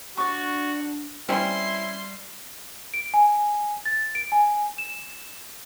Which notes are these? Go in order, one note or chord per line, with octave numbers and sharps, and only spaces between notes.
D4 F#4 D5 C#6
G3 C4 C#4 E4 C6
D7
G#5
A6
D7
G#5
E7